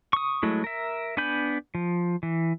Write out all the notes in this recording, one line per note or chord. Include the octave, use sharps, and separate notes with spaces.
C#6 D#6
F#3 G#3 A3 E4
A#4 E5
B3 D4 G#5 B5 G6
F3
E3